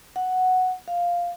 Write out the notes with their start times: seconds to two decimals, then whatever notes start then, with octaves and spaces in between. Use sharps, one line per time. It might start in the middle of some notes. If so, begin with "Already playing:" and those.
0.16 F#5
0.88 F5